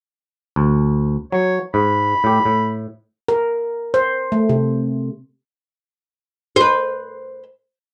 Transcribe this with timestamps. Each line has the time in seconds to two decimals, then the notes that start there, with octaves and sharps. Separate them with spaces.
0.56 D2
1.32 F#3 C#5
1.74 G#2 B5
2.24 A2 G4
2.46 A2
3.28 A#4
3.94 C5
4.32 A3
4.49 C3
6.56 B4 C5